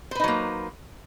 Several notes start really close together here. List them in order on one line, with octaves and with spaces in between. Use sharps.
C5 B4 D#4 F#3 A#3